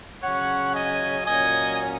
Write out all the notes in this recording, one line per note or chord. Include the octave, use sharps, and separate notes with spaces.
C#3 F#3 C#4 C#5 F#5
D#5 G#5
A#2 F#3 C#4 D#5 G#5